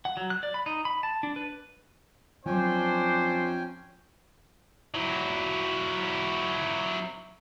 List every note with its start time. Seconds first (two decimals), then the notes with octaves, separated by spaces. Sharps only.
0.05 F#5
0.17 F#3
0.30 F#6
0.43 D5
0.54 B5
0.66 D#4
0.85 B5
1.03 A5
1.23 D4
1.36 B4
2.46 F2 F#3 C#4 D4 C5 G5 G#5
4.94 F#3 E4